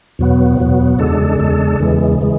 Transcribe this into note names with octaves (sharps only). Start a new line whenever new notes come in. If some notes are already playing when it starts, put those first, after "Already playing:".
E2 B2 F#3 B3
E2 B2 F#3 B3
E2 C#3 G#3 D4 A4
E2 C#3 G#3 D4 A4
E2 C#3 E3 G#3
C#3 E3 G#3